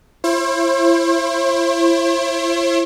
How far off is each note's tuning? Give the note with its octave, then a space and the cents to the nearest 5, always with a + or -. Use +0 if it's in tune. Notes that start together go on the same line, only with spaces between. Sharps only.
E4 +35 C5 +45